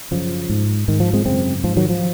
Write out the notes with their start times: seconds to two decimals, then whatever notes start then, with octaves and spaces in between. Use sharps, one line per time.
0.11 F#2 C#3 F3
0.50 G#2
0.88 G#2 D#3
1.00 F3
1.13 G#3 C4
1.25 F#2 C#3 G#3 C4
1.64 G#2 F3
1.76 D#3 F#3
1.89 F3